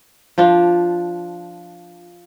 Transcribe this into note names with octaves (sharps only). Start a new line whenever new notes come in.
F3 D4 F4